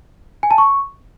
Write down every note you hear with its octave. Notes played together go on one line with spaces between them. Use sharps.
G#5
A5
C#6